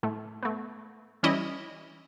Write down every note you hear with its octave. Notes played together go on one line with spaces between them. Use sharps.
A2 A3
A3 B3
E3 G3 C#4 E4 D#5